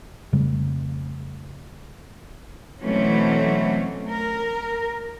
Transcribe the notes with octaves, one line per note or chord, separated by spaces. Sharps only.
F2 C#3 G3 A3
B2 E3 F#3 A3 C4 C#4
A#4